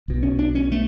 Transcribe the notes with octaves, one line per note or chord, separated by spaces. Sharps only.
B1 B2
C#4
D4
C#4
A3